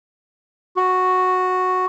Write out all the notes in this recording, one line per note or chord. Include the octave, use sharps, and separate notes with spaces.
F#4